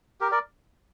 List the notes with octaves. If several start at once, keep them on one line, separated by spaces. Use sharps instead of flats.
G4 A#4
A#4 D5